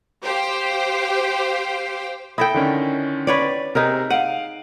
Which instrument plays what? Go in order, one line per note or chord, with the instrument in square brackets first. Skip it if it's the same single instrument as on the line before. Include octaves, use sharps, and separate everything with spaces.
[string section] G4 C5 F5 G5
[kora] E4 A4 G5 [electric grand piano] D#6 A#6
[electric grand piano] D3 D#3 C#4
[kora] B4 C#5 D5
[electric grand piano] C3 A#5 [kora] D#4 G#4 A#4
[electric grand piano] F5 D7 D#7 [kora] F#5